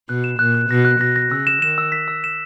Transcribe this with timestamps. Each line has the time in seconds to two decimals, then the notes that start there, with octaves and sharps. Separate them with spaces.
0.09 B2 F#6
0.24 E7
0.39 A#2 F#6
0.54 F#6
0.69 B2 A#6
0.85 F#6
1.00 B2 A#6
1.16 A#6
1.31 C#3 E6
1.47 E7
1.62 D#3 E7
1.78 E6
1.92 B6
2.08 E6
2.24 E7